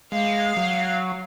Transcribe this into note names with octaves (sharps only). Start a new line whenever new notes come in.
G#3 F5
F#3